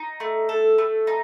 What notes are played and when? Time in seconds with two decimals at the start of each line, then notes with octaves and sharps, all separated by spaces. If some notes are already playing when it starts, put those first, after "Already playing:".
Already playing: D#4
0.20 A3
0.49 A4
0.78 A3
1.07 D#4